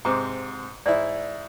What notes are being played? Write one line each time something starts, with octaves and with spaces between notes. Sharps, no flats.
G#2 C3 A#5 D6
G#2 E4 D5